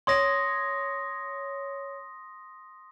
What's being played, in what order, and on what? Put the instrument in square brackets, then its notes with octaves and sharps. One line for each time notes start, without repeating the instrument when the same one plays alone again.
[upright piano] C#5 [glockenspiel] C6 D#6 A#6